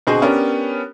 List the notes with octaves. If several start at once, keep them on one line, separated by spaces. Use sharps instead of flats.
B2 D3 C4 G#4 C5 D#5
B3 C#4 D4 G4 A#4